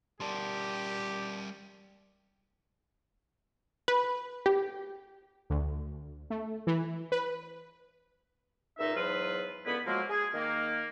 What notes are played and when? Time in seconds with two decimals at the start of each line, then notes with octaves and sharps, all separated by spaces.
0.20 G3 G4 A#4 D5 A5 C6
3.88 B4
4.46 G4
5.50 D2
6.30 A3
6.67 E3
7.12 B4
8.79 C#2 A#2 D#4 E5
8.95 E2 G#2 F#3 F4 B4
9.66 C#2 D3 B3 E4 B5
9.85 F3 F#3 G#3 A#3
10.09 G#4
10.33 D#3 A#3